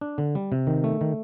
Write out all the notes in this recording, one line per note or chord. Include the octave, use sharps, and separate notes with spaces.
D4
D3
G3
C3
D#3
A3
D#3